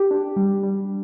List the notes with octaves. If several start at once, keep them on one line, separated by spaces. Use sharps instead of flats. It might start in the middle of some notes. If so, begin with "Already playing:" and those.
Already playing: G4
D4
G3
G3